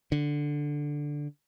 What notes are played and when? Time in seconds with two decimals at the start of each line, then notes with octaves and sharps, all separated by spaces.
0.12 D3